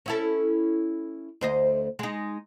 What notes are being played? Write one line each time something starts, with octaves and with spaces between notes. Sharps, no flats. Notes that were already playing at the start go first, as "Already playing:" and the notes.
C#4 E4 A4
D2 C5 D#5
G#3 D#4